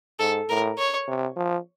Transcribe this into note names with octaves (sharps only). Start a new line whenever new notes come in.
G#2 A4
A2 A#4
C#5
C3
F3